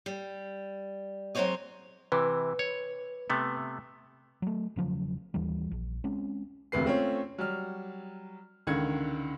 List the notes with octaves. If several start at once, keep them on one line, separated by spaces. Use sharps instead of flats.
G3
F#3 G#3 C4 C5 C#5 D#5
C3 E3 B4
C#5
C3 A3 B3
F#3 A3
E1 C#3 F3 F#3
D#2 E3 G3
A#1
G#3 C4 C#4
E1 D2 C3 B4 C7
A3 C4 C#4 F4 C#5
F#3 G3 F6
C#2 D3 D#3 G#6 C#7